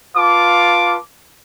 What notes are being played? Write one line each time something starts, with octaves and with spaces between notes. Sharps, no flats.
F4 B4 F5 A5 D6